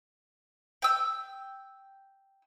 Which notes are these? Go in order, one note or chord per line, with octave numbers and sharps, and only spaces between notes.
G5 E6